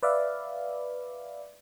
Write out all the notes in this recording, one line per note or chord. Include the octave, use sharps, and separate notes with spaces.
B4 D5 E5 F5